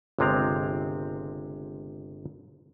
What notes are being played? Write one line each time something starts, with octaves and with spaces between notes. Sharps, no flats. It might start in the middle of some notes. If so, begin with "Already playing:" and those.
G1 C#2 C3 G#3 C4 A#5